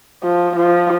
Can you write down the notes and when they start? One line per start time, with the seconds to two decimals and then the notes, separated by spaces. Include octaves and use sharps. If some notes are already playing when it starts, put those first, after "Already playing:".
0.23 F3
0.56 F3